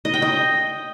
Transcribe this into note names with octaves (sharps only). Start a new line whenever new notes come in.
D#5
G5
D#5